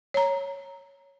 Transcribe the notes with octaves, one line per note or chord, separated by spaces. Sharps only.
C#5 A#5